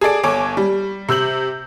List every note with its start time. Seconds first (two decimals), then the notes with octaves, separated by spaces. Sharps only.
0.01 G#4 A4 D5 D7
0.23 G1 C#5 G#5 D6 D7
0.57 G3
1.09 C3 E6 G6 F#7